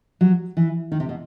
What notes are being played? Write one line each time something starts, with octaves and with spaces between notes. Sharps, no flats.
F#3
E3
D#3
C3
B2